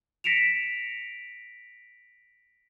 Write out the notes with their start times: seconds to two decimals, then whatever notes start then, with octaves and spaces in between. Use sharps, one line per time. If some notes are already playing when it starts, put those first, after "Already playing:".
0.24 A#6 B6 C#7 D7 E7 F7